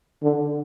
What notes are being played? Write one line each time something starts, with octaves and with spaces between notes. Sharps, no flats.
D3